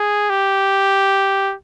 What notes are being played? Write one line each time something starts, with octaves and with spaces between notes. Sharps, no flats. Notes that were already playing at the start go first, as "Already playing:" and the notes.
Already playing: G#4
G4